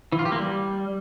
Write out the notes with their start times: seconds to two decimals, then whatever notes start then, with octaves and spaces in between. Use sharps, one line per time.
0.12 E3
0.19 F4
0.25 G4
0.32 A#3
0.38 G3